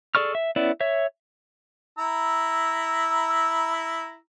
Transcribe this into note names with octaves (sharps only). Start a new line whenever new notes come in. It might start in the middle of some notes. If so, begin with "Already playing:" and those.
G#4 A4 D5 C#6 F6
E5
B3 C#4 E4 D5
C#5 E5
E4 A#5 E6